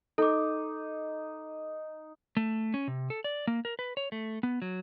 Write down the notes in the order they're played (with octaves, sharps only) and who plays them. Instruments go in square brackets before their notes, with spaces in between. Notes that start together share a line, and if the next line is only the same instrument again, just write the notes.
[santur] D#4 [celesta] A4 D6
[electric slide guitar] A3
C#4
C3
A4
D5
A#3
A#4
B4
C#5
A3
B3
F#3